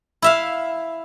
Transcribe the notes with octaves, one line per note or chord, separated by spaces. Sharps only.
E4 E5 F5